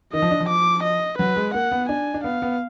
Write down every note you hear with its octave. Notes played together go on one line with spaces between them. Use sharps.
D#3 D#5
F3
D4
F3
D6
D#5
F#3 B4
G#3
A#3 F#5
B3
D4 G#5
D4
B3 F5
B3